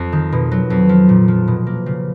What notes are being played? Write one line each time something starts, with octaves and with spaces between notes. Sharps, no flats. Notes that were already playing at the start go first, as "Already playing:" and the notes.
Already playing: F2
D#3
B2
F#3
F2
F3
A#2
F3
B2
A#3
C#3